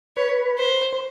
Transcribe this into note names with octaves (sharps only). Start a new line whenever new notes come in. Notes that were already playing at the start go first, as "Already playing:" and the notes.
B4 C#5
C5
C5